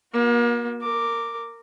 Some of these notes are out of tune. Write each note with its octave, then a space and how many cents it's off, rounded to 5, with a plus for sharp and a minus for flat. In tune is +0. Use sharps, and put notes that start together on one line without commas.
A#3 +35 F#4 -30
A#4 -15 D6 +0